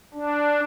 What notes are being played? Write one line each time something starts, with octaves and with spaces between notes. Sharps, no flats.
D4